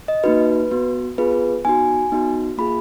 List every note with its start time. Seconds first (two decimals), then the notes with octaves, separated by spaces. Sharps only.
0.08 D#5
0.24 A#3 D#4 F#4 B4
0.71 B3 F#4
1.18 B3 F4 G#4 B4
1.65 B3 D#4 F#4 G#5
2.12 B3 D#4 F#4
2.58 A#3 F4 G#4 B5